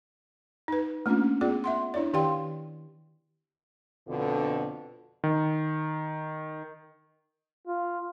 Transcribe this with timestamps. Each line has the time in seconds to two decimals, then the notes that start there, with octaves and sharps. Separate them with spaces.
0.68 D#4 B4
1.06 A3 A#3 C#4 D4 F4
1.41 B3 F4 G#4 D5
1.64 E5 F#5 C6
1.94 D4 E4 C#5 D5
2.14 D#3 G4 D5 F5 G5 C6
4.08 F2 B2 D3
5.24 D#3
7.67 F4